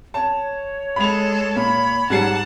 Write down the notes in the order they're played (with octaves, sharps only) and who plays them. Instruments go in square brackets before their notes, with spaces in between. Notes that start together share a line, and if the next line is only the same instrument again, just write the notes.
[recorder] C#5 [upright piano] A5
[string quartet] G#3 A4 [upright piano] B5 F7
[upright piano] A#2 [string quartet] B5
[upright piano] G#2 G3 C7 [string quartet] F#5 A5